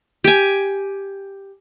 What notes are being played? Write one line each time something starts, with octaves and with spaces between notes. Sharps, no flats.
G4 G#5